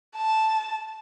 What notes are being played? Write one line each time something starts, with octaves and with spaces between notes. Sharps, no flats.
A5